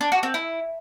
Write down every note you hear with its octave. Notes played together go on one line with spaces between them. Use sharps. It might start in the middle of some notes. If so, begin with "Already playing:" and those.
D4
F#4
C4
E4